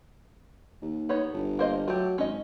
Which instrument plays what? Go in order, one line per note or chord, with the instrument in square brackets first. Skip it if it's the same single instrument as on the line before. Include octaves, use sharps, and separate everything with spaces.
[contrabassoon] D#2
[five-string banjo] B3 D#4 C#5
[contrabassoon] G1
[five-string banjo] A#3 C5 D#5
[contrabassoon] F#3 [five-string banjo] A3 G4
[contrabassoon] G#1 [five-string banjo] C#4 D#5